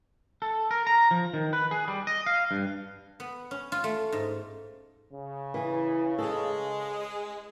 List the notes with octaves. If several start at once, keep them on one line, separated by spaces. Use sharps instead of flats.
A4
A#4
A#5
F3
D#3
B4
G#4
G3
D#5
F5
G2
B3
C#4
F4
A3
G#2
C#3
E3
G#3 A4